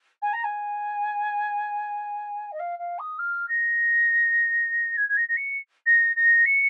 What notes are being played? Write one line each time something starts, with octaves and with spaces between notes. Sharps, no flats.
G#5
A#5
G#5
D#5
F5
F5
D#6
F6
A#6
G#6
G#6
A#6
A#6
C#7
A#6
A#6
C#7